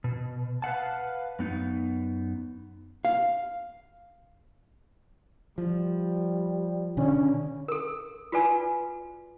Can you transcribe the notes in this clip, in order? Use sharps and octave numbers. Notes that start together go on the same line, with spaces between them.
B2
B4 F5 F#5 A5
F#2 B3 D#4
F5
F3 G3
B2 D3 D#3 C#4 D4
A4 A#4
F4 F#4 B4 D5 G#5